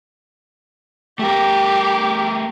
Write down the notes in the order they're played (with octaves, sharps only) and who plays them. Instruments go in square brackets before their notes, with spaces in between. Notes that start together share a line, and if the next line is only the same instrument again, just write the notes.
[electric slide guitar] A3 A#4 [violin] G4